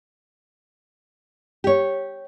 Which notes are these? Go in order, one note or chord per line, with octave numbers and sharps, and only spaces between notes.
G4 C#5